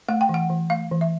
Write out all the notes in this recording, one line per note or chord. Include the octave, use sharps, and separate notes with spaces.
A3 F#5
G5
E3
F#5
E3
A3 F5
E3
E5